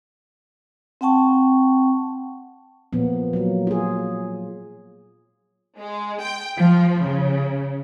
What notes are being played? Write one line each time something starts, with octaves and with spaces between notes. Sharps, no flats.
C4 F#5 G5 A5 C#6
A#2 F3 A#3 B3
F#3 A#3
F4 G#4
G#3
G5
F3
C#3